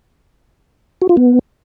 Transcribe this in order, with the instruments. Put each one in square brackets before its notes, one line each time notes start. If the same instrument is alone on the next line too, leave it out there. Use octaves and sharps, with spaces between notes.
[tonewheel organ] F#4
F4
B3